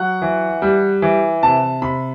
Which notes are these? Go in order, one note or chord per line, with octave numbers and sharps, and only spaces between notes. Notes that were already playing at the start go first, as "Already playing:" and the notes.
Already playing: F#3 F#5
E3
G3
E3
C3 A5
C3 B5